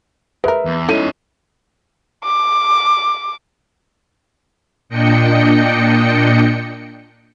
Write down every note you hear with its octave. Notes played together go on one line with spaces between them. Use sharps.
G#3 A#4 B4 E5
E2
A3 C#4 D#4 E4 D#7
D6
A#2 D4 D#5 G5 C#7